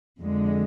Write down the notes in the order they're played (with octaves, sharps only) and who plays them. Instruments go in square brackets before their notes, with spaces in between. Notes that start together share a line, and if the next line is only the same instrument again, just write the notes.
[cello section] F2 D3 G#3